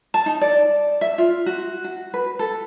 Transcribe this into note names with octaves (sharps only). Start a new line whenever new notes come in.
A5
D#4
D5
E5
F4
F#4
F#4
B4
A4